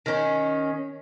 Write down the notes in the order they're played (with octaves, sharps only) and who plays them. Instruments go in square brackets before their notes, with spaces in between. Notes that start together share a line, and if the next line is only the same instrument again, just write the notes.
[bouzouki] D#3 C#4